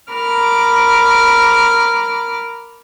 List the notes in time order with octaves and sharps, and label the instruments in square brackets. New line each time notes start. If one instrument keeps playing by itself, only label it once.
[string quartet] A#4 B5 D6 F6